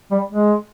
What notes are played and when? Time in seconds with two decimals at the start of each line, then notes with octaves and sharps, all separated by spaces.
0.11 G3
0.32 G#3